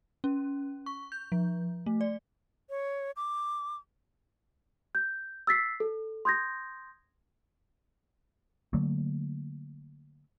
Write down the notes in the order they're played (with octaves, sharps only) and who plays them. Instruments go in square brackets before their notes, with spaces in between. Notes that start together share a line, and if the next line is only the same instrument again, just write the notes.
[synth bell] C#4
C#6
G6
F3
A3
D5
[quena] C#5
D6
[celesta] G6
E6 A6 B6 C7
A4
C6 D#6 G6 G#6 A#6
[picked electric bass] D3 F#3 A3 A#3